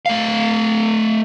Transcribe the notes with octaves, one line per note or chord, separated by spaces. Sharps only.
A3 F5